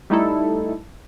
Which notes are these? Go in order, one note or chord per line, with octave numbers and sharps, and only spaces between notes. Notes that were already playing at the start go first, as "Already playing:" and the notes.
G3 A3 D#4 E4 A4